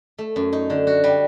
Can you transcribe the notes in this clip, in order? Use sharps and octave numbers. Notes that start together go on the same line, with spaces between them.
A3
F#2
D#4
D3
F#4
G3